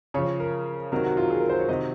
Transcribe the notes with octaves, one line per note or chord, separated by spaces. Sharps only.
C#3 F3 C#5
A#4
C3 D#3 F#3 A#4
F#4
F4
G#4
A#4
C5
C#5
C3 D#3 F#3 D#5